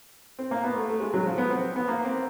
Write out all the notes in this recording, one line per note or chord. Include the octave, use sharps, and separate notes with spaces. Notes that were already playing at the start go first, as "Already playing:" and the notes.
C4
A#3
B3
A3
A3
G#3
F#3
F3
B3
C4
B3
A#3
C4